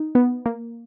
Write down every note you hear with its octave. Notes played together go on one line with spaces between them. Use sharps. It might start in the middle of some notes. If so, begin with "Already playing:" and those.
Already playing: D#4
B3
A#3